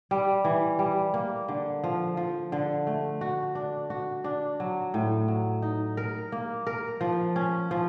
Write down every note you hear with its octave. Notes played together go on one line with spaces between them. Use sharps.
G3
E3
G3
A#3
D3
F3
F3
D3
A3
F#4
D4
F#4
D4
F#3
A2
F#3
D#4
A#4
A#3
A#4
F3
C#4
F3